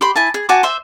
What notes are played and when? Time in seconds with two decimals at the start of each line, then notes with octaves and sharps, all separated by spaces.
0.01 G4 B5 C6
0.16 E4 G#5 A5
0.34 G#4
0.49 F#4 G#5 A5 D6
0.63 C5 E5